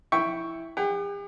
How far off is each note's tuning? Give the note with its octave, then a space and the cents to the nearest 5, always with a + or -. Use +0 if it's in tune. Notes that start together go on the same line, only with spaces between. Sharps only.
E4 +0 G5 +0 C#6 +0
G4 +45 F#5 +40